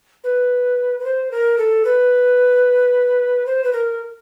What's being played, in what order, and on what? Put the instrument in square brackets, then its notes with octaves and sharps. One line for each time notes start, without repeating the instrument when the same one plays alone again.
[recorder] B4
B4
C5
A#4
A4
B4
C5
B4
A#4